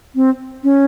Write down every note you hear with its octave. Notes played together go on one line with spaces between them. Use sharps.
C4
C#4